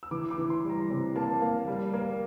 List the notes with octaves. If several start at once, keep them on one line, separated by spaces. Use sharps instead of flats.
E6
E3 D6
D6
E3
C6
G3
A#5
C3
A#3 A5
A#3 F5
G3
A#3